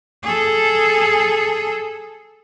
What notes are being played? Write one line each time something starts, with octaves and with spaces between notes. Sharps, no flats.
G#4 A4